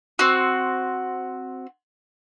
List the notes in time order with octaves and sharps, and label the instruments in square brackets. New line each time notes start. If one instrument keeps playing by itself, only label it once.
[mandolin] C4 F#4